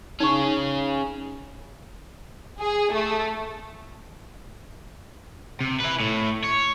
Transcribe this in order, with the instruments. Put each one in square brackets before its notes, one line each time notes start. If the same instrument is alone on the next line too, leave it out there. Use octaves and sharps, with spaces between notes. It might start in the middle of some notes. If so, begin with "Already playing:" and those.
[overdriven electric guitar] C#4 G#4 [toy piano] D#4 C#6
[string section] G#4
A3
[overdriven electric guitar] C3
E4 B4
A2
C#5